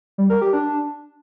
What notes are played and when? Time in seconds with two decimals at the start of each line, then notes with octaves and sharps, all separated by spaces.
0.18 G3
0.30 A#4
0.41 G4
0.53 D4